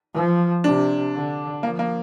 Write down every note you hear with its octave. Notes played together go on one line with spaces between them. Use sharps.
F3
C3 D4
D3
F3 A#3
A#3